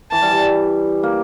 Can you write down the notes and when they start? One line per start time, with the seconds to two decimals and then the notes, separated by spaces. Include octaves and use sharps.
0.12 E3 A5
0.22 G3
0.32 G3
1.03 A#3